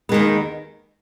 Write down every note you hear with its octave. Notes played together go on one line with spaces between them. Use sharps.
D#2 D#3 G#3 B3